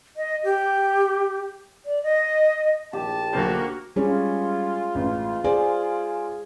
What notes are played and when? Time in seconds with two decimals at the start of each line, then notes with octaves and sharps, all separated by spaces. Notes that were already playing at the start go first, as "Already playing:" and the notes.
0.17 D#5
0.44 G4
1.85 D5
2.03 D#5
2.93 A#1 G4 A5
3.33 B1 D3 A#3 F#4 C5
3.96 G3 G#3 C#4 F4 G#4 C#5
4.95 A1
5.44 G#4 C5 D5 G#5